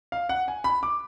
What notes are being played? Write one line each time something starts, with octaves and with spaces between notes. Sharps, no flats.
F5
F#5
G#5
B5
D6